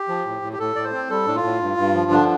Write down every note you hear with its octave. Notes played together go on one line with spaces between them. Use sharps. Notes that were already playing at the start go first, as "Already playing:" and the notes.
Already playing: G4
F3
A2
A2
G4
A2 A4
A2 D5
C5
C4
G3 A4
A2 D4
F4
A2
G2
G2
F3
D3 D4